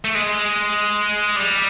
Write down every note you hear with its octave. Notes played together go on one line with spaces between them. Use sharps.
A3
G#3
G3